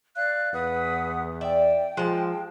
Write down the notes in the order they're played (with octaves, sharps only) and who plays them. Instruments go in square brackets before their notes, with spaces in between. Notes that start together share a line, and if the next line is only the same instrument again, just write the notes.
[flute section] D5 F5 F#6
[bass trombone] E2 [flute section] B4 F#5 D#6
[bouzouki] D5 E5 [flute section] G5
[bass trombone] F3 [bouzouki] G#3 A5